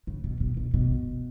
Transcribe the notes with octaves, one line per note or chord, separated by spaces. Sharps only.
C#3
B2
B2
B2
B2